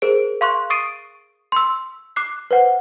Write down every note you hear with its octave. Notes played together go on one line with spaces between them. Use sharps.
G#4 A#4 C5 D7
F5 C6 C#6 F#6
C#6 D#6 A6 C7 D7 D#7
C6 E6
D6 F#6 C7
B4 C5 F#5